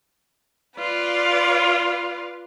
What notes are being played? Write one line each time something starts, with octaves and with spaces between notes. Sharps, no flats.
F4 B4 D5